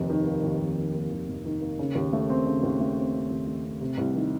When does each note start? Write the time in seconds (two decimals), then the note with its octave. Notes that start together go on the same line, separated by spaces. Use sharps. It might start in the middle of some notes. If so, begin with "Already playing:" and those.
Already playing: F1 D#2
0.10 D#3
0.26 A#3
0.43 D#2
0.60 F1
0.77 D#3
0.95 A#3
1.12 D#2
1.28 F1
1.45 D#3
1.61 A#3
1.79 C#3
1.95 D#2
2.13 A3
2.30 C4
2.46 C#3
2.63 D#2
2.80 A3
2.97 C4
3.14 C#3
3.30 D#2
3.47 A3
3.64 C4
3.81 C3
3.98 C2
4.15 D#3